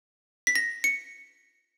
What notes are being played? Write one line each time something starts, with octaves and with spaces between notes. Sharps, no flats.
B6
A#6
C#7